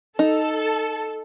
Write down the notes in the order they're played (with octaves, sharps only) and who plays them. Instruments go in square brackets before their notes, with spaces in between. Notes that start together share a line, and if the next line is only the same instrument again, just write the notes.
[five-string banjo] D#4 [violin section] A4